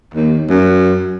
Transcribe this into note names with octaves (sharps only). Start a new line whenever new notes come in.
D#2
F#2